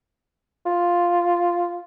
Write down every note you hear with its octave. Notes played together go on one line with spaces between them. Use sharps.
F4